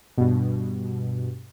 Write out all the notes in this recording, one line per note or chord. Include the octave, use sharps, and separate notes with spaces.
G2 B2